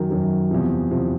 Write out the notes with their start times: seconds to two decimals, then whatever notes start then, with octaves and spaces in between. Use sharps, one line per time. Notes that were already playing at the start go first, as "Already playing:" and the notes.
Already playing: F#2 D#3 F#3
0.10 F#2 D#3 F#3
0.51 E2 C3 F3
0.91 E2 C3 F3